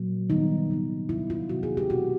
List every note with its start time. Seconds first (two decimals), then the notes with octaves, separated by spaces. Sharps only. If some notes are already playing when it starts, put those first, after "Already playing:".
Already playing: A#2 F#3 A#3
0.30 C3 D#3 G3 B3 D#4
0.70 C3 D#3 G3 B3
1.09 C3 D#3 F#3 B3 E4
1.30 F4
1.49 C3 D#3 F#3 B3 F#4
1.63 G#4
1.77 G4
1.90 B2 G#3 C4 F#4